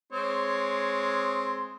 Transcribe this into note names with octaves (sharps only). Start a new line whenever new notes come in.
G#3 C4 C#5